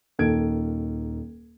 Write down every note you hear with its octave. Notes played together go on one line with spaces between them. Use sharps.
D#1 D#3 A#3 A4 G#6 D7